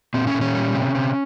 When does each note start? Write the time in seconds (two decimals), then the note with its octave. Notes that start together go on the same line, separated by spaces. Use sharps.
0.14 A#2 C4
0.27 C#4
0.34 A#2
0.41 C#4
0.54 G3
0.74 C3
0.95 C3